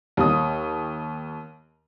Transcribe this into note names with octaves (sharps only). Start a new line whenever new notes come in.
D#2 D#6